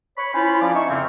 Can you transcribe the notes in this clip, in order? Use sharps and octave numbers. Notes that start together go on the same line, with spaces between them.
C#5 B5
C#4 E4 F4 C5 B5
F3 C#4 G#4 D5
D#4 E5 C#6
F2 C#3 A#3 C4